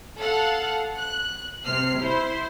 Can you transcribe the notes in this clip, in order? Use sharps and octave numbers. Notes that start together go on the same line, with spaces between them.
A4 F5 F#5
F#6
C3 F6 C7
E4 C5